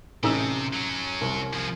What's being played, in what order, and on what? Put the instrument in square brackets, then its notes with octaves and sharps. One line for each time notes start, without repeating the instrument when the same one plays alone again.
[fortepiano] A1 D#4 E6 [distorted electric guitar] C3
[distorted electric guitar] F#3 C#4
[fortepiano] C2
[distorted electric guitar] F3 G#4